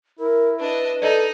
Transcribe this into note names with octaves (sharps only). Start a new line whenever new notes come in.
E4 A#4
D4 B4 D#5
D#4 A4 D5 D#5 F#7